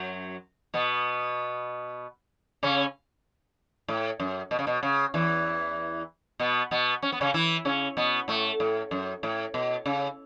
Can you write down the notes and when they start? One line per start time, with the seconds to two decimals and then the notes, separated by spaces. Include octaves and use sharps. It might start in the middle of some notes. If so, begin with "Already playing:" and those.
Already playing: F#2 F#3
0.74 B2 B3
2.63 C#3 C#4
3.88 A2
4.20 F#2
4.51 B2
4.59 C#3
4.67 B2
4.83 C#3
5.14 E2 E3
6.39 B2 B3
6.71 B2 B3
7.02 C#4
7.12 B3
7.21 C#3 C#4
7.34 E3 E4
7.65 C#3 C#4
7.97 B2 B3
8.28 A2 A3
8.60 A2
8.91 F#2
9.23 A2
9.54 B2
9.86 C#3